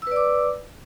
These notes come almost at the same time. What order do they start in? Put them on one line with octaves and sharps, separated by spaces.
E6 B4 D5 D6